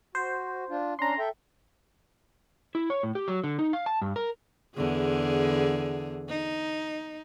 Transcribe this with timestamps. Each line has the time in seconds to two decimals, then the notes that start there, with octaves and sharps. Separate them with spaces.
0.15 F#4 C5
0.70 D4 F4
0.99 C#4 D4 A#5 C6
1.19 A4 E5 G5
2.75 E4
2.90 C#5
3.03 A2
3.15 G4
3.28 F#3
3.44 D3
3.59 D#4
3.73 F5
3.86 A5
4.02 G2
4.16 A#4
4.76 E2 D3 G#4
6.29 D#4